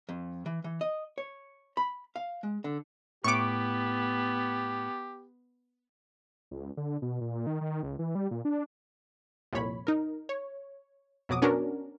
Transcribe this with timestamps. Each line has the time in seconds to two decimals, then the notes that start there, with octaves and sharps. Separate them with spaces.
0.09 F2
0.46 E3
0.64 E3
0.81 D#5
1.18 C#5
1.77 B5
2.16 F5
2.43 G#3
2.64 D3
3.24 A2 B3 G4 C#6 D6
6.51 C#2
6.77 D3
7.02 B2
7.21 A#2
7.35 A#2
7.47 D#3
7.61 D#3
7.83 C#2
7.99 E3
8.15 G3
8.31 A#2
8.45 D4
9.53 C2 F2 A#2 C#5 B5
9.87 D#4 A#4
10.29 C#5
11.29 F2 B2 F#3 D6 D#6
11.42 B3 C#4 D4 F#4 A#4